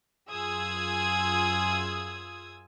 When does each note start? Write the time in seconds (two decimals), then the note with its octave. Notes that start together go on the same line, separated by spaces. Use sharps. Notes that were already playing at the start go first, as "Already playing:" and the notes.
0.29 F#2 F4 G#4 D#6 E6 G#6